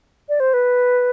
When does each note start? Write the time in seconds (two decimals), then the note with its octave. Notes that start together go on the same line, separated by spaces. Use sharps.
0.29 D5
0.40 C5
0.54 B4